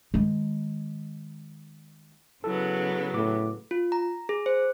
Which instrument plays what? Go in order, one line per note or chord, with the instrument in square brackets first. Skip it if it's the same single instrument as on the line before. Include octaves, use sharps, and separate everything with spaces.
[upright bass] D#3 G#3
[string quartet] C#3 F#3 B3 [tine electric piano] E4 A4
[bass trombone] A2 [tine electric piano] D6
[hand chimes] F4
A#5
G#4
C5